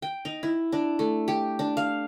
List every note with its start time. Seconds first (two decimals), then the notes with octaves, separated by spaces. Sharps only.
0.02 G5
0.25 D#4
0.43 E4
0.72 D4
0.99 A3
1.28 G4
1.59 D4
1.77 F5